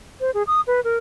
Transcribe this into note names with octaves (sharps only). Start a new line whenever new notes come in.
C5
G#4
D#6
B4
A#4